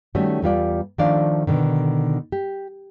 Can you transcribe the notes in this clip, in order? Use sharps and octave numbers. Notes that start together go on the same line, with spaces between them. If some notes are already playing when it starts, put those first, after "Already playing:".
D#3 G3 A3 C#4 F#4
E2 G3 F4 D5
D#3 F3 A3 D4 D5 F5
B2 D3 D#3
G4